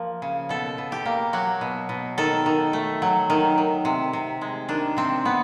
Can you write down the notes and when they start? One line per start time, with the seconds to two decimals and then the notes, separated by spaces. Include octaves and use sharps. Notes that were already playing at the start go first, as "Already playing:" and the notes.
Already playing: F3 A#3
0.22 C#3
0.49 B2 A4
0.78 B2
0.92 G4
1.05 A#3
1.33 F#3 F#4
1.61 B2
1.89 B2
2.18 D#3 A4
2.46 D#3
2.73 A3
3.02 F#3
3.30 D#3
3.58 D#3
3.85 C3
4.13 C3
4.41 G#3
4.69 D#3 D4
4.97 C3 C4
5.25 C3 B3